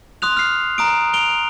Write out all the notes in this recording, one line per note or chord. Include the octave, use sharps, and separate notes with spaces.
C6 D#6 F#6 F7
F6 C7
A#5 D#6 D7
D7 F7 G7